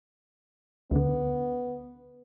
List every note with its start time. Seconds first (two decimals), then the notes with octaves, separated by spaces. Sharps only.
0.91 D2 D3 B3